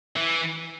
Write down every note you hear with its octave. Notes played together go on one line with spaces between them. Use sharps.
E3